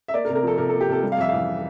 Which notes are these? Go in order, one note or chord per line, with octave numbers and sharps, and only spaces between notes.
E5
A#3 D5
A#4
C3
A#4
F3 A4
C3 A#4
A#3 A4
G4
C3 A4
G3
F5
F2 E5
E3 F5